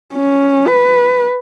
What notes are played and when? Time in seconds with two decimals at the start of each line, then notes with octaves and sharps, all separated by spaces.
0.14 C#4
0.67 B4